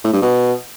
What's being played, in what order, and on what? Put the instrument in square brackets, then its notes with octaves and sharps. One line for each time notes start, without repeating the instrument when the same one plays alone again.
[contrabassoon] A2
G2
B2